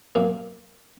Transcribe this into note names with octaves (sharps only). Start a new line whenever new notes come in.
F#2 A#3